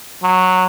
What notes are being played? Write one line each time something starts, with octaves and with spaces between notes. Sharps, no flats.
F#3